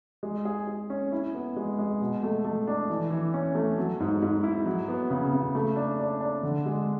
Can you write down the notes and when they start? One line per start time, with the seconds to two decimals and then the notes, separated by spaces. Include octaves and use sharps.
0.23 G#3
0.45 G#4
0.67 G#4
0.90 C#4
1.12 E4
1.35 B3
1.56 G#3
1.79 G#3
2.01 B2
2.23 A3
2.45 A3
2.67 D4
2.90 E3
3.10 E3
3.34 C#4
3.55 A3
3.78 F#3
4.00 G#2
4.22 G#2
4.43 E4
4.66 F#3
4.88 B3
5.10 C#3
5.33 C#3
5.55 A3
5.76 D4
5.99 D4
6.21 D4
6.43 D3
6.66 G#3